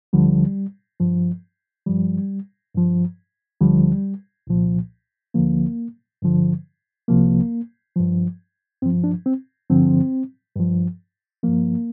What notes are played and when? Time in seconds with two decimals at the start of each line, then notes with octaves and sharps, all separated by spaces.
0.13 D2 D3 F3 G3
1.00 G2 F3
1.86 G2 F3 G3
2.74 G2 F3
3.61 D2 D3 F3 G3
4.47 C2 A#2 F3
5.34 D2 D3 F3 A#3
6.22 G2 D3 F3
7.08 C2 C3 F3 A#3
7.96 G2 F3
8.82 G2 F3 C4
9.04 D4
9.26 C4
9.69 G2 D3 F3 C4
10.56 G2 F3
11.43 G2 F3 A#3